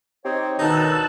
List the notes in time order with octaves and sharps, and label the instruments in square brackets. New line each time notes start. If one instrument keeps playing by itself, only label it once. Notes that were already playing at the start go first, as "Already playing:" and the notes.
[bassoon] C4 [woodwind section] D#4 G4 C#5
[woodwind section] D2 D#3 [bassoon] B2 [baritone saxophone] D#4 [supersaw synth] A5 E6 F#6